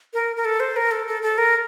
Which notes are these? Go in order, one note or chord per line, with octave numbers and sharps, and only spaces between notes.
A#4
A#4
A4
C5
A#4
A4
A4
A4
A#4